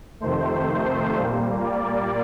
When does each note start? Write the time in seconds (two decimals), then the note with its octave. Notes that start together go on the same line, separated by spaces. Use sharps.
0.20 F2 C3 D#3 A3 C5
1.16 A#2 G3 A#3
1.64 D5